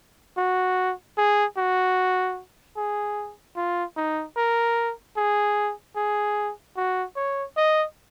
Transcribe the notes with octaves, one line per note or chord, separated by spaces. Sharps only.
F#4
G#4
F#4
G#4
F4
D#4
A#4
G#4
G#4
F#4
C#5
D#5